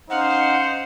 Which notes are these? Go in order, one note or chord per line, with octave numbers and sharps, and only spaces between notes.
C#4 D#4 C5 F5 F#5